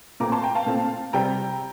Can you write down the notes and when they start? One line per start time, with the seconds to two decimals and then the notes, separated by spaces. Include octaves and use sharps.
0.20 A#2 A3 C4 A#5 D6
0.32 A5 C6
0.43 G5 A#5
0.55 F5 A5
0.66 A#2 A3 C4
1.13 C3 G3 C4 G5 A#5